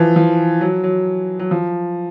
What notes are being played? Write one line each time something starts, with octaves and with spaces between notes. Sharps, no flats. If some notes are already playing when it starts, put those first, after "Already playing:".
Already playing: E3 F3
F3
F#3
F#3
F#3
F3